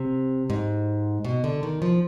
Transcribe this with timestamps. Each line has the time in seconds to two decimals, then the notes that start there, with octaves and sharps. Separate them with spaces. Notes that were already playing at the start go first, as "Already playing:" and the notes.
Already playing: C3
0.50 G#2
1.25 B2
1.44 D3
1.63 D#3
1.82 F3